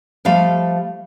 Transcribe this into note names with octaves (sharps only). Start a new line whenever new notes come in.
F3 G3 A3 F5